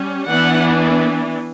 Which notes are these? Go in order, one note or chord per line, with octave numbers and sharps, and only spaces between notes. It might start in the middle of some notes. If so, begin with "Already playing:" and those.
Already playing: G3 C#4
E3 B3 D4 F#5